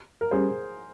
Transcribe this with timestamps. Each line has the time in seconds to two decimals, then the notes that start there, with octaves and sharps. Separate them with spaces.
0.21 A#4
0.31 G3 C#4 G4 G#4 C5